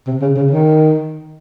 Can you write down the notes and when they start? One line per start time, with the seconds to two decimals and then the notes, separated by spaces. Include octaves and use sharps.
0.07 C3
0.21 C#3
0.36 C#3
0.51 D#3